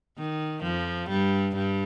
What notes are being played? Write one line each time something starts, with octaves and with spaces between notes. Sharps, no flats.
D#3
F2 F3
G2 G3
G2 G3